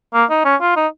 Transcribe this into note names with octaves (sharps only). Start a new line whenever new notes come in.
A#3
D#4
C#4
F4
D#4